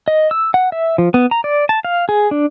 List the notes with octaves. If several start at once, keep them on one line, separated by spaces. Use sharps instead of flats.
D#5
E6
F#5
E5
F3
B3
A#5
D5
A5
F5
G#4
D4